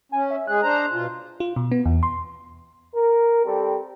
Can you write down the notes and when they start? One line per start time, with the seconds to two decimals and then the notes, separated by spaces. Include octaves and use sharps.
0.12 C#4 G#5
0.31 E5
0.47 G#3 G#4 F#6
0.62 D4 C5 A#5
0.93 B2 F4
1.40 F4
1.56 B2
1.72 B3
1.86 E2
2.03 C6
2.95 A#4
3.45 G3 C4 G4 A4